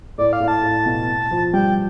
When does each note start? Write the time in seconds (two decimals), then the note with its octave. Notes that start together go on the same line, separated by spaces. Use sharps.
0.18 A2 D5
0.33 F5
0.40 A2
0.48 A5
0.63 A2
0.86 B2
1.31 F3
1.53 G3 G5